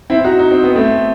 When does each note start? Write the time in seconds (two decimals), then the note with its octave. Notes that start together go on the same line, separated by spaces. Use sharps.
0.10 C4 E4
0.24 D#4 F#4
0.39 D#4
0.51 C4
0.63 B3
0.76 A3 C4